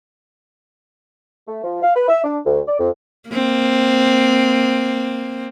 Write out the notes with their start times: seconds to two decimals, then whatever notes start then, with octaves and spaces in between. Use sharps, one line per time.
1.48 A3
1.64 F3
1.82 F5
1.96 B4
2.08 E5
2.24 D4
2.46 D2
2.68 D5
2.79 F2
3.30 A#3 C4